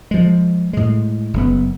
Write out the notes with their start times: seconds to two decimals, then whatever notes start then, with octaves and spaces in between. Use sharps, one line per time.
0.11 F3 G#3
0.73 A2 G#3
1.34 F#1 A2 B3